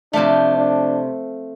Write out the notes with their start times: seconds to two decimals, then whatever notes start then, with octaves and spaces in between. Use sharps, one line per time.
0.13 C3 F3 A3 D4
0.57 D4